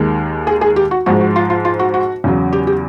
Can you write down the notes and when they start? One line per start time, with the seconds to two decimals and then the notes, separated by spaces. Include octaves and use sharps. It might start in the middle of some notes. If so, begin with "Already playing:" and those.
Already playing: D#2 D#3 G#3
0.47 G#4
0.61 G#4
0.76 G4
0.91 F#4
1.06 G#2 F3 G#3 F#4
1.21 F#4
1.36 F4
1.50 F4
1.65 F4
1.79 F#4
1.94 F#4
2.24 E2 C#3 F#3
2.53 G4
2.67 G4